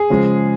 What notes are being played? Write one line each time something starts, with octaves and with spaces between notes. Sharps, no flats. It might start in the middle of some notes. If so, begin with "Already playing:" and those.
Already playing: G#4
C#3 F3 G#3